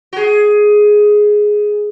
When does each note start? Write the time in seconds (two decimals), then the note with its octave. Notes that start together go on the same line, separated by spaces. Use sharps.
0.13 F#4
0.17 G#4